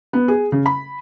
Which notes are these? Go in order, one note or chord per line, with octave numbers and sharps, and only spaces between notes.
B3
G#4
C#3
B5